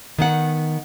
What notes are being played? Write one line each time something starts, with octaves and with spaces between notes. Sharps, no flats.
D#3 B3 F#5